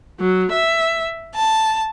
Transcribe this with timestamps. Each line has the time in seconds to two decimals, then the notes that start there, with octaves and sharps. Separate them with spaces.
0.21 F#3
0.53 E5
1.35 A5